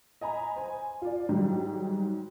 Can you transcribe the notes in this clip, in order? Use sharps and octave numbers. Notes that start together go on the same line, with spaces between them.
D#5 G#5 A#5 B5
C5 G#5
F4 D5
G#2 D#3 F#3 G3